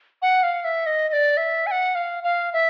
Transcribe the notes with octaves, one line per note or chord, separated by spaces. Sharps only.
F#5
F5
E5
D#5
D#5
D5
E5
G#5
F#5
F5
F5
E5